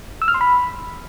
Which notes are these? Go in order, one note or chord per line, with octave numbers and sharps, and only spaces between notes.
E6
F6
C6
B5